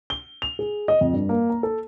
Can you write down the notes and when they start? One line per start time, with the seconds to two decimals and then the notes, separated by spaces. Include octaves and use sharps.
0.10 G7
0.42 F7
0.59 G#4
0.88 D#5
1.01 F2
1.13 G2
1.29 A#3
1.50 A#5
1.63 A4